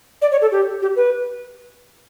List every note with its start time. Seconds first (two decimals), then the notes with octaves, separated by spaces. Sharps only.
0.22 D5
0.32 C#5
0.42 A4
0.52 G4
0.82 G4
0.96 B4